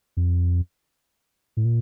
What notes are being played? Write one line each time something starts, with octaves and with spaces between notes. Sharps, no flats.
F2
A2
A#2